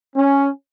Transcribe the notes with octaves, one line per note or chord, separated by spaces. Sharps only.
C#4